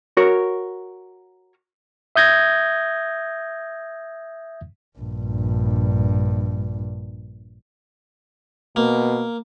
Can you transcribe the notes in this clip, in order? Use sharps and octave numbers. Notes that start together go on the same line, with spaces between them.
F#4 A#4 C#5
E5 D#6 G6 G#6 A#6
A#1 G2
B2 A#3